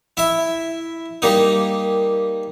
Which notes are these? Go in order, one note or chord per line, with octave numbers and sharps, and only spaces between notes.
E4 E5
G3 A#3 D#4